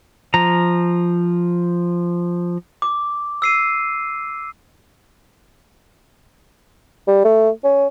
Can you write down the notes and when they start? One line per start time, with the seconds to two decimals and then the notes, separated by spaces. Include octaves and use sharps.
0.34 F3 A#5
2.82 D6
3.42 E6 C7 D#7
7.08 G3
7.25 A3
7.64 C#4